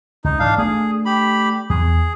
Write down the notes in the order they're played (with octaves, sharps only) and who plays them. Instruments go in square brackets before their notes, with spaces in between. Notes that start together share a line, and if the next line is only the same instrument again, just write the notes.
[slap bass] C#2 [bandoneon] D#4
[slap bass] G#2 E3 [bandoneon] D4 F5
[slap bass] A3 D4 [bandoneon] G#4
[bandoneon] G4 B5
[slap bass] E2 [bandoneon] G#4